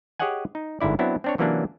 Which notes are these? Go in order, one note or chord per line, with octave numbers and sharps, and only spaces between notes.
G4 G#4 C#5 D#5 F#5 G#5
D#4
G1 G#2 D3 E4 D5
F#3 B3 C4 D4 E4
C4 D4 C#5
C3 E3 F#3 A#3 C#4 D4